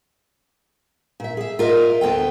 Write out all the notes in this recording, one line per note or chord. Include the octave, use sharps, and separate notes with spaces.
A#2 E5
G#4 E5
F4 A#4 D#5 E5
D2 B3 A4 G5